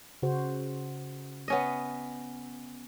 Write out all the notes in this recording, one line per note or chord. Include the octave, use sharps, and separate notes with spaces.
C#3 F#4 C5
B3 C#4 D#5